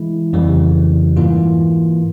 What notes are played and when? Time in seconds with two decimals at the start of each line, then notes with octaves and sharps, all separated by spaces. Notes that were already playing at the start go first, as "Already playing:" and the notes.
Already playing: E3 G#3 E4
0.33 F2 C#3 E3 G3
1.17 G#2 E3 A#3 F4